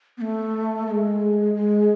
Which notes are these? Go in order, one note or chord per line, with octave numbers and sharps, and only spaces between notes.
B3
A3
A3
G#3
G#3